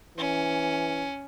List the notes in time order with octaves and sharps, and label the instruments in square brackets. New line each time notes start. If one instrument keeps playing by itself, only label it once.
[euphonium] E3 [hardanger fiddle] C#4